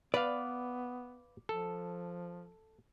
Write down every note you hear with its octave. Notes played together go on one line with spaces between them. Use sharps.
B3 B4 D5 F5
F3 A4